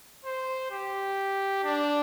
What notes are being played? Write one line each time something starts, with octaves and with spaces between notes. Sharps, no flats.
C5
G4
D4